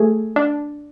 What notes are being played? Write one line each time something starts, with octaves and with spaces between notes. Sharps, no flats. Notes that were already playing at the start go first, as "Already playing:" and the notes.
Already playing: A3 G#4
D4